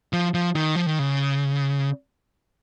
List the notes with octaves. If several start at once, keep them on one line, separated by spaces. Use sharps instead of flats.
F3
F3
D#3
F3
D#3
C#3